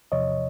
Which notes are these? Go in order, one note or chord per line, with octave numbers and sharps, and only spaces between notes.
E2 C3 F3 C#5 D#5